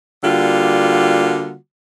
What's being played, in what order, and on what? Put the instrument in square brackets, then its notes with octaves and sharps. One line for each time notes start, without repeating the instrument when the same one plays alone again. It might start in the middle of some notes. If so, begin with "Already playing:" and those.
[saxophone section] D3 G3 A#3 F4 F#4